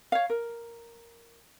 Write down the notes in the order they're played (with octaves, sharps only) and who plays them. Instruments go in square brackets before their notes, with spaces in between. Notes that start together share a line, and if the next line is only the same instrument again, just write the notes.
[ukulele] C#5 F5
A#4